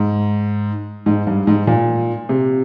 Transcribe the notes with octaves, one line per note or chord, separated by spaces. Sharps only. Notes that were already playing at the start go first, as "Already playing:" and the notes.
Already playing: G#2
G#2
G2
G#2
A#2
C3